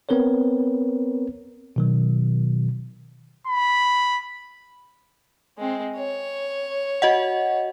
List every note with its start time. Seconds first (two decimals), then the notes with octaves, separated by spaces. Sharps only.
0.09 B3 C4 A#4 B4 C#5
1.76 B2 D#3 F#3
3.47 B5
5.58 G#3 C4
5.97 C#5
7.02 F#4 D#5 F#5